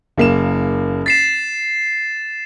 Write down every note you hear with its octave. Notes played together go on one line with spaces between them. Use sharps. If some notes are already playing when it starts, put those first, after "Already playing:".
F#1 A#3 E7
A6 B6 C7 E7